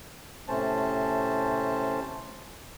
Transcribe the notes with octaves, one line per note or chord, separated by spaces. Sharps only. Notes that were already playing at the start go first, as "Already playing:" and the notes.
A2 C3 A3 C#4 C5 A5